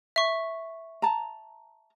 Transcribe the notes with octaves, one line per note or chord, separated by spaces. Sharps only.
E5 C#6
A5 A#5